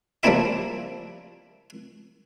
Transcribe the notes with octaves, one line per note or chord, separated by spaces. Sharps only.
F3 G3 A#3 C4 E4 E5